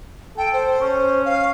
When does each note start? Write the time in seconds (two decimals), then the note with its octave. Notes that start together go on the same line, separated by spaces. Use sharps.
0.37 A4 G5
0.53 C5
0.81 C#4
1.25 F5